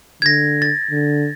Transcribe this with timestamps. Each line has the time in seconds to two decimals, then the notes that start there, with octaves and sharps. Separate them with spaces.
0.22 D3 G#6 A#6
0.62 A6
0.91 D3